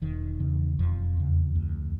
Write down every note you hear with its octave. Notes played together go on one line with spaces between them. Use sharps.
E1 D#3
E2 C#3
E1 F2 F3
E2 C#3
D2